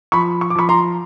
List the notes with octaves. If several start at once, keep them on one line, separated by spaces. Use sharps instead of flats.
F3 B5 C#6
C#6
D6
F3 B5 C#6
A#5 C6